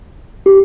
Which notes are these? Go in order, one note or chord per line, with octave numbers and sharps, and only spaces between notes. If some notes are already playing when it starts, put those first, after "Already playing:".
G4